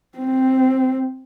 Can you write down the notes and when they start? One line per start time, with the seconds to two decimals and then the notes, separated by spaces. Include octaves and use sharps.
0.18 C4